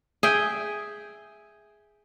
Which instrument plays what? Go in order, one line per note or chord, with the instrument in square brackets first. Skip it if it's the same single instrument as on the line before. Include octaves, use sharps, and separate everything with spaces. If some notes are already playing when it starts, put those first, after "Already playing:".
[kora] G#4 E5 G5